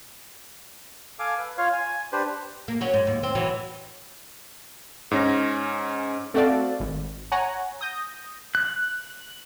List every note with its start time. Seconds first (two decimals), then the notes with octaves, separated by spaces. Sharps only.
1.19 A4 F5 G#5 D6
1.38 B4
1.57 F4 C#5 F5
1.72 G#5
2.12 D4 G4 B4 C5
2.68 A#3
2.81 F#3 C#4 F#4
2.94 G#2
3.07 D#2
3.23 C4
3.35 E3 F#3
5.11 G#2 C#4 A#6
6.34 A3 C4 F#4 A4 D5 F5
6.80 G#1
7.32 C#5 F#5 G#5 A#5
7.81 D#6 G6 A#6
8.55 F#6